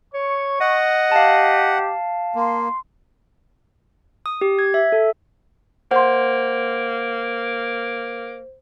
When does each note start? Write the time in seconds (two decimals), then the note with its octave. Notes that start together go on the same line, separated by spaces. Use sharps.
0.14 C#5 C#6
0.60 D#5 F#5
1.12 G4 F5 A5
2.35 A#3 C6
4.26 D#6
4.41 G4
4.59 G#6
4.74 E5
4.92 A4
5.91 A#3 C5 F#5 C6